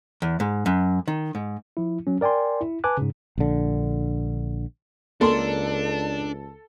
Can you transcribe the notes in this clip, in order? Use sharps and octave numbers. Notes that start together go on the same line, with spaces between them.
E2
G#2
F#2
D#3
G#2
F3 E4
F#3 C#4
A#4 D5 G5 G#5 C6
E4
B4 G#5 A5 D6 F#6
G#2 C#3
A#1 D3
C#2 A#3 D4 A4 C6